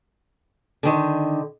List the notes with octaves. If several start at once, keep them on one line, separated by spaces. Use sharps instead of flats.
D3 D#3